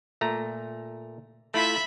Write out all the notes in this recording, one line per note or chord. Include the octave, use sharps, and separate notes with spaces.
A#2 A3 A#5
A3 E4 F4 E5 B5